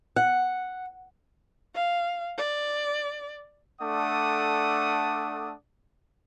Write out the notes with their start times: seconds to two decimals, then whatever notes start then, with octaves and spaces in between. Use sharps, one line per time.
0.16 F#5
1.75 F5
2.38 D5
3.82 A3 D4 A4 D5 F#5 D#6